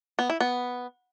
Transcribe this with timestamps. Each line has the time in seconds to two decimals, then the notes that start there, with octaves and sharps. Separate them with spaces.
0.19 B3
0.30 E4
0.41 B3